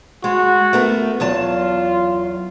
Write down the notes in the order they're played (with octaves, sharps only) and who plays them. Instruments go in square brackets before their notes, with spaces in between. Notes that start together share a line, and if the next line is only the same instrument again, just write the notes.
[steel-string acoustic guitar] G#3 [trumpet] F#4
[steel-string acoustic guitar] A3 B3 A#4
[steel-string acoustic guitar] E2 F#3 A5 [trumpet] F4